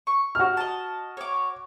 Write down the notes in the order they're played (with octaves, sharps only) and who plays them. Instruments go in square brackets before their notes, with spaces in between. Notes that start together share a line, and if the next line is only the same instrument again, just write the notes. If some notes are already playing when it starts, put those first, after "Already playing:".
[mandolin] C#6
[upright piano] F#4 F6
[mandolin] D#5 A5
C#5 D6